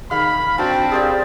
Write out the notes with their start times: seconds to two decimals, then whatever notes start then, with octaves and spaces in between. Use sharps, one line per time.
0.11 D#3 G#4 F5 B5 F6
0.58 C4 D4 F#4 G5 A5
0.92 G4 G#4 A#4 C5 D5 F5